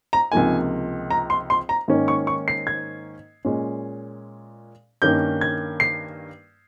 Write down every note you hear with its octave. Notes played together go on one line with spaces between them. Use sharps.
A#5
C#2 C3 F3 A#3 D#4 G#5
A#5
C6
C6
A#5
G#2 D#3 A#3 C#4
C#6
C#6
C7
G#6
A#2 G#3 C#4
G2 D#3 A#3 C#4 G6
G#6
C7